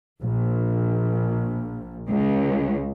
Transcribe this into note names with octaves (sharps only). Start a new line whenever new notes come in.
A#1
C#2